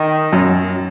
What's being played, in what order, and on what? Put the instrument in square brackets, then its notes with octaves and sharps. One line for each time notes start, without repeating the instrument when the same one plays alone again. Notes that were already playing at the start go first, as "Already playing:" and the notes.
Already playing: [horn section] D#3
[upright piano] F#2